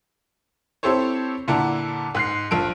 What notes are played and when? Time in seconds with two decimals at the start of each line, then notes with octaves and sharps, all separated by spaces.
0.83 C4 E4 G4 A4 C5 C#5
1.48 A#2 D3 E4 F#5 A5 A#5
2.15 G#2 F#6 C7
2.51 A#1 F4 A5 D7